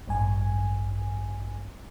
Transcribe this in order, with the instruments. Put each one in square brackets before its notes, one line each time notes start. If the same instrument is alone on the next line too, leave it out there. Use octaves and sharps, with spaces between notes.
[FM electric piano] A1 G2 G#5